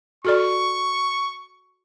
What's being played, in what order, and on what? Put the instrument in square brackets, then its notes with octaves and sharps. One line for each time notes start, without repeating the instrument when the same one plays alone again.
[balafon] F#4 A4 D5 [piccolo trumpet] C#6